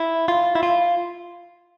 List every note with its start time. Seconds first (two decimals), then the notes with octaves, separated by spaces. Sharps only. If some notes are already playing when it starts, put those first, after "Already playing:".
Already playing: E4
0.28 F4
0.55 E4
0.63 F4